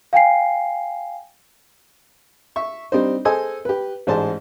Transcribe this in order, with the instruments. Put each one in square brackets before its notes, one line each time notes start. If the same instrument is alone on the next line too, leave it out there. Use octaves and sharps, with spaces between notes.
[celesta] F5 G5 G#5 C7
[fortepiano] E5 C#6
G3 C4 D4 D#4 C5
G#4 A4 C5 D#5 G#5 E6
G4 B4
A1 G#2 G#4 C5 D5 A5